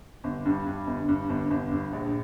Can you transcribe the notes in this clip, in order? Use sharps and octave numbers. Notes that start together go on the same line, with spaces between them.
G1
G2
G2
G1
G2
G1
G1
G2
A#1